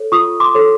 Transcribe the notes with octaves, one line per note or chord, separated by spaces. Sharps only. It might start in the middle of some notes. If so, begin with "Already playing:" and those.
Already playing: A4 C#5
F4 C#6 D#6
C6 D6
A4 C#5